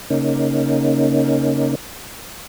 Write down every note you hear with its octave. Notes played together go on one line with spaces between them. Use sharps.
C#3 A#3 C#4 D#4